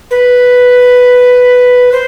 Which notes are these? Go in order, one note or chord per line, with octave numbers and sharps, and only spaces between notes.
B4
C5